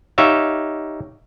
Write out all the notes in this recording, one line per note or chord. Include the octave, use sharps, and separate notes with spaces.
D#4 G4 C#5 E5 F5